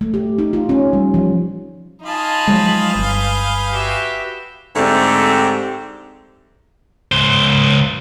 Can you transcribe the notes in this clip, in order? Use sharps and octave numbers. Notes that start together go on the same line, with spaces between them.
A3
G4
D#4
F4
C#4
G3
F3
D#4 F4 F5 G#5 A5 B5 D#6
F3 F#3 G#3
G1 B4 G6
F#4 G4 E5
G#2 D3 A3 C4 G4
C#2 C5